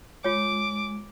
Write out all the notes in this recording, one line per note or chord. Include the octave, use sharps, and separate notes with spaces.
G#3 F4 C#5 D6